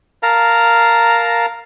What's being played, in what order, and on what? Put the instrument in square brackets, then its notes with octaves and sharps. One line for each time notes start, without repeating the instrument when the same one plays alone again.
[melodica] A#4 F5 A5 A#5